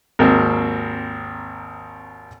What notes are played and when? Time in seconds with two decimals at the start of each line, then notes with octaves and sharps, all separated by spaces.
0.19 G#1 D#2 A#3 C4 F6